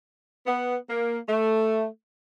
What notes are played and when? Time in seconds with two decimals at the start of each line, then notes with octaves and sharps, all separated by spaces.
0.47 B3
0.88 A#3
1.28 A3